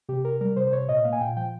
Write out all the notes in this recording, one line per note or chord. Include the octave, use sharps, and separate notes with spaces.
C3 G4
C3 A#4
G3 A#4
C3 C5
C5
C3 C#5
A#2 D#5
A#3 F5
G#5
A#2 G5
F3 G5